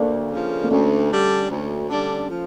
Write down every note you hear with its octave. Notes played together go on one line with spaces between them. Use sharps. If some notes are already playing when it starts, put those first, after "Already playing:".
Already playing: D2 A3 A#3 D4
C#3 F3
A#3
D2 A3 C#4
D3 G3 D4
D2
D3 G3 D4
F3